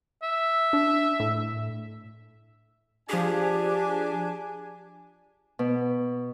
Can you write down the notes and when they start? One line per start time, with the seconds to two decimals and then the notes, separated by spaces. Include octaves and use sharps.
0.23 E5
0.73 D4
1.20 A2
3.09 F3 D4 G4 G#4 G#5
5.59 B2